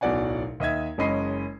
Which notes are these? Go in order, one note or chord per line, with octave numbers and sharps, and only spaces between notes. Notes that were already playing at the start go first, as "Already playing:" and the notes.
D1 B1 B2 D5 F#5 G#5
D#2 D#5 E5 G#6
F#1 G#3 C#4 D#5 B5 C7